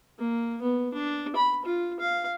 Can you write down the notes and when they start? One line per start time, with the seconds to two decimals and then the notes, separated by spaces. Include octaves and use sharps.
0.19 A#3
0.62 B3
0.94 D4
1.36 B5
1.65 F4
2.00 F5